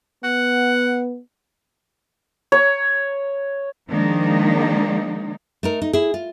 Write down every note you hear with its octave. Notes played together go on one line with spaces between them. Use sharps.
B3 F#5
C#5
D#3 F3 G#3 A#3 D4 D#4
A3 D#4 A#4
D#4
E4 G#4
F4